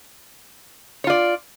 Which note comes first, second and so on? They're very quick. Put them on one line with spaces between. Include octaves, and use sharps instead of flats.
C#5 F4 D5